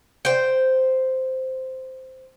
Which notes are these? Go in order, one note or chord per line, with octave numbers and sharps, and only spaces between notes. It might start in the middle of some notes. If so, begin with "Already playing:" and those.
C5 G5